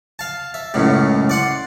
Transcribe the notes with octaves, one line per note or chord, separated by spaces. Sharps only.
F5 A5
E5
C#2 F#2 A2 C#3
D5 F#5 C6